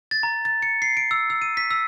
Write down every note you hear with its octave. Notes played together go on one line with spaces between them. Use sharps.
A6
A#5
A6
C#7
C7
D7
E6
E6
D#7
B6
E6